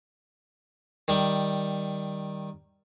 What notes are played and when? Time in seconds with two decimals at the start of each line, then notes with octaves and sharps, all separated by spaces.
1.08 D#3 G3